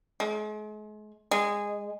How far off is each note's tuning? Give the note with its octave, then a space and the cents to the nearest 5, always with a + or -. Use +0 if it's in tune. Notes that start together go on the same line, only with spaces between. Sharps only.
G#3 +40
G#3 -15